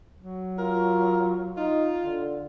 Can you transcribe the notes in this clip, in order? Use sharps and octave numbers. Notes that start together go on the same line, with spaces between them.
F#3
F4 A#4
D#4 F4
D3